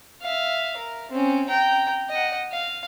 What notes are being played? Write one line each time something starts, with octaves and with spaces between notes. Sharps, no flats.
E5 F5
A#4
C4 C#4
G5 A#5
D#5 F#5
F5